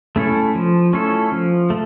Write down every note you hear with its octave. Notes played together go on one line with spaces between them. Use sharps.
A3 C#4 E4 A4
F3
A3 C#4 E4 A4
F3
A3